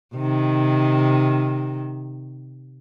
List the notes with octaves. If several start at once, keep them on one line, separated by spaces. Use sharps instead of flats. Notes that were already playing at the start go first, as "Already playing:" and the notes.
C3 D#3